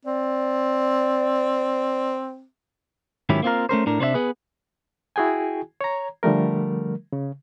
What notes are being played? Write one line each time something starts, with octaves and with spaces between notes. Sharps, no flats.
C4 D5
G#2 D#3 F#3 C#4 E4 G4
A#3 C4 F4 A#4
A3 C#4 A#4 C5
A2 D4 A#4
C3 C4 D4 C5 E5
B3 G#4 B4
E4 F#4 G#4 G5 G#5
C#5 A#5
D3 F3 G3 A3 A#4
C#3